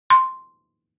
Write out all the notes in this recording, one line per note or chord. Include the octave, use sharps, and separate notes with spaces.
C6